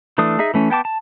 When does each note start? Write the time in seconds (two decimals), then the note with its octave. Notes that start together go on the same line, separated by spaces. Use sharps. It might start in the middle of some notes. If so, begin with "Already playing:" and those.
0.18 E3 A3 D4 D#6
0.39 D#4 G#4 E5
0.54 E3 A3 C#4
0.70 B3 G5 A5 D6
0.85 A5